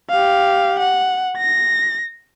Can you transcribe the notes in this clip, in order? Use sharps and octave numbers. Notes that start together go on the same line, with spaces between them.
G4 F5
F#5
A#6